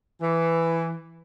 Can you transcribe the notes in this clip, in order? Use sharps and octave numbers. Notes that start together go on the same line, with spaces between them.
E3